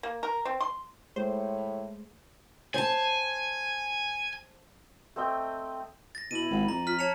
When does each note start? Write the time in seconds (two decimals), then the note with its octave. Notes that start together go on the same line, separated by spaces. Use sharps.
0.03 A#3
0.23 A#4
0.45 C4
0.60 C6
1.16 A2 G#3 A3 G#4 C5
2.74 C5 G#5 A5
5.16 A3 C4 D#5 G5
6.15 A6 A#6
6.31 B2 E4 D#7 F#7
6.51 G#1
6.68 F2 A#5
6.87 F4 F6 B6
6.99 C#5 A5 C#7 F7